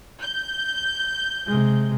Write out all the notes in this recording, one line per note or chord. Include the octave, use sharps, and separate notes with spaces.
G6
C3 G#3